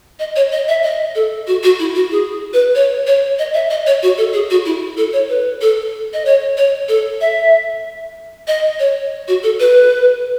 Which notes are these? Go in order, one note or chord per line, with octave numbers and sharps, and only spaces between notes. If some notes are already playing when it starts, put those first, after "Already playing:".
D#5
C#5
D#5
E5
D#5
A4
F#4
F#4
E4
F#4
G#4
B4
C#5
C#5
D#5
E5
D#5
C#5
F#4
A4
G#4
F#4
E4
A4
C#5
B4
A4
D#5
C#5
C#5
A4
E5
D#5
C#5
F#4
A4
B4